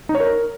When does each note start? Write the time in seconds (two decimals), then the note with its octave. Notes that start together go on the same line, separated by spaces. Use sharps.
0.09 D#4
0.15 C#5
0.20 A#4